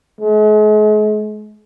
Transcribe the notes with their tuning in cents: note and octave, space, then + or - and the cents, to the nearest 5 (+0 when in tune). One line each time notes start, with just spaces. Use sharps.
G#3 +40